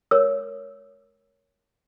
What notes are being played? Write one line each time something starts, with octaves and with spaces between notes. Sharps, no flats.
A#4 C#5 E6